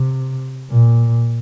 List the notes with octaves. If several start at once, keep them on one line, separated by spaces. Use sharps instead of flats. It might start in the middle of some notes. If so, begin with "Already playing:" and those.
Already playing: C3
A#2